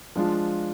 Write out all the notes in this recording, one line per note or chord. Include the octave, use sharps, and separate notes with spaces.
F3 G#3 D4 F4